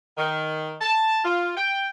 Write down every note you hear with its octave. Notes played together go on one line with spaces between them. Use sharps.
D#3
A5
F4
G5